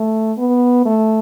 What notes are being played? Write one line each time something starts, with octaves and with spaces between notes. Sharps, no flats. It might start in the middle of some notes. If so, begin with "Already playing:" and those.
Already playing: A3
B3
A3